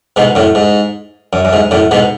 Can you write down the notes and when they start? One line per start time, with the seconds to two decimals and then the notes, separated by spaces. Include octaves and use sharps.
0.16 G#2 B2
0.35 F#2 A2
0.55 G#2
1.33 F#2
1.45 F#2
1.53 G#2
1.71 F#2 A2
1.91 G#2 B2